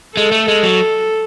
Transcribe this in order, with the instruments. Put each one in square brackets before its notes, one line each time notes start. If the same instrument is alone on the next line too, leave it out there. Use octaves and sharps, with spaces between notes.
[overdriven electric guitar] G#3 [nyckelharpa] A4
[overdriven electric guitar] A3
G#3
F#3